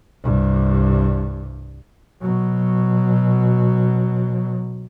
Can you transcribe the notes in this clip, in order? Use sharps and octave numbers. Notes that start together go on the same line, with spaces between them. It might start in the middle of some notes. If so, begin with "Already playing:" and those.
C2 G2
B2 F#3